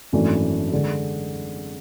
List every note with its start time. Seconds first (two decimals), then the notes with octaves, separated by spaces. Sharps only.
0.13 G#1 F#2 E3 A3 D4
0.72 D3 G#3